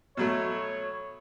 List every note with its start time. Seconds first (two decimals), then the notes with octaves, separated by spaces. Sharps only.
0.17 B2 F#3 A3 C#5